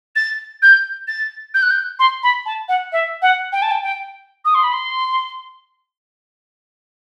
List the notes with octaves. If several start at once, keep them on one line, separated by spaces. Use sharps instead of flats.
A6
G6
A6
G6
F#6
G6
C6
B5
A5
F#5
E5
F#5
G5
A5
G5
G5
D#6
C6
B5
C6